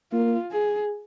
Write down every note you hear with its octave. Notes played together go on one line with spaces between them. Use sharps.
A#3 F4
G#4